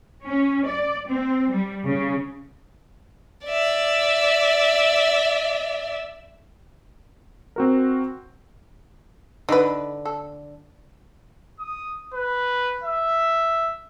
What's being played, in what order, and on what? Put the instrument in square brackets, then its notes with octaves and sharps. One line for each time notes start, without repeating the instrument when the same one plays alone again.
[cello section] C#4
D5
C4
G3
C#3
[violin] D5 E5
[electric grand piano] C4 F#4 A#4
[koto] D3 [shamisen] D#4 B4
[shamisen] A4
[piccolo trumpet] D#6
B4
E5